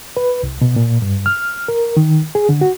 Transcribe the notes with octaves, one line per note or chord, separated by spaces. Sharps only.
B4
C2
B2
A#2
G2
F6
A#4
D#3
G#4
D3
F#4